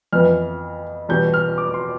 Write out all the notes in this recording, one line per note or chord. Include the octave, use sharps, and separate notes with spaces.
F2 E3 B3 F6
E2 B2 G3 G6
F6
D6
C6